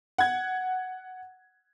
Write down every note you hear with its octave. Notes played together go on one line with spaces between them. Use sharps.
F#5 G#6